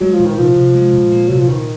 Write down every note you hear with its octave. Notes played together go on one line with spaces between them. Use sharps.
F#3 G#3
F3
A#2
D#3
C3 F3
C3
G#3
A#2
A#3
C3 F#3
F3
A#2 D#3